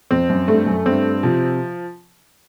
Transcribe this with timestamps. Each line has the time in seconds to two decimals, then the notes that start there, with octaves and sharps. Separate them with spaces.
0.11 F2 C4
0.30 F#2
0.48 G2 A3
0.67 F#2
0.86 G2 C4
1.23 C3 F3